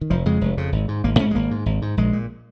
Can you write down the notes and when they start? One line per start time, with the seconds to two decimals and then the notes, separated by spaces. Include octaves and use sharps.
0.01 D#3
0.10 F1 F3
0.25 F2 C#3 G#3
0.41 F1
0.57 F2 C#3
0.72 G#1
0.88 G#2
1.04 G#1 A#3
1.19 G#2 C#4
1.31 G#3
1.35 G#1 A#3
1.51 G#2
1.66 G#1
1.82 G#2
1.97 A#1 G#3
2.13 A#2